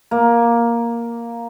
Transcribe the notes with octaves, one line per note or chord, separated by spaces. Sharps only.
A#3